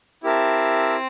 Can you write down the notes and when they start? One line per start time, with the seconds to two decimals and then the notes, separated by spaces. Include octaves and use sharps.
0.23 C4 E4 G4 A#4 E5 A5